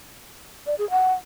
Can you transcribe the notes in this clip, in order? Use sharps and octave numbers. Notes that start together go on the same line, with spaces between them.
D5
G#4
F#5